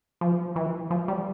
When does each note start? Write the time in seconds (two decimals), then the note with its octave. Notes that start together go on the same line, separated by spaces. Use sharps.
0.21 F3
0.56 E3
0.90 F3
1.08 G3